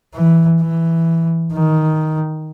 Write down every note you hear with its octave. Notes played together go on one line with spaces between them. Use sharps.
E3
E3
D#3